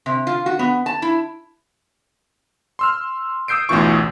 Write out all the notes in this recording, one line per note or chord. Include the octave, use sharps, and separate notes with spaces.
C3
F4
F#4
B3
A5
E4
C6 E6 F6
D#6 E6 G6 C7 D7
A1 D2 B2 E3 F4 C#6